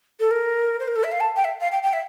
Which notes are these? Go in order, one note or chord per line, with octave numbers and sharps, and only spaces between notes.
A4
A#4
C5
A#4
A4
E5
F5
A5
G5
E5
F5
G5
G5
E5